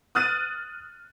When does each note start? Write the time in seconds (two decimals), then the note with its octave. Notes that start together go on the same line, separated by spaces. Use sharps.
0.15 D#6 F6 F#6 A6 D#7